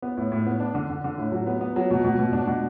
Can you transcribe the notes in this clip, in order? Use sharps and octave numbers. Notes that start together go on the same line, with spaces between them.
B3
A2
A2
B3
D4
D3
D3
D3
A2
F#3
B3
B3
F#3
B2
B2
B2
D4
B2